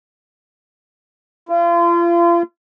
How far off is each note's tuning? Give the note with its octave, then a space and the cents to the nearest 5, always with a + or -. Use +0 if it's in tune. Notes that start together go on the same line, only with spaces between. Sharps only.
F4 -35